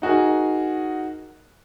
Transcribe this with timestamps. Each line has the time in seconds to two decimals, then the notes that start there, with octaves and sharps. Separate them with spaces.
0.02 D#4 F#4 G#4 A#4